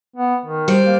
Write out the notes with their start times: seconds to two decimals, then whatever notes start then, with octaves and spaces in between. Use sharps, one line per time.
0.16 B3
0.46 D#3
0.68 G3 C5 D5
0.86 A#3